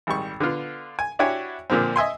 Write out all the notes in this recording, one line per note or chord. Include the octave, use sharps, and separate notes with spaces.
G#1 G3 C#6
D3 B3 F4
G#5
D4 E4 F#4 G4 C#5 G#5
A#2 D3 F3 A#3 C4
D#5 E5 G#5 C6